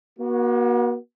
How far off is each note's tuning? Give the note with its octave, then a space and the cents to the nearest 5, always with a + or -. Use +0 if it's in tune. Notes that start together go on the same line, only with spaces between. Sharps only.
A#3 +45 F#4 +0